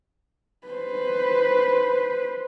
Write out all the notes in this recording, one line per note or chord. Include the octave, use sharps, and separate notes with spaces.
B4 C5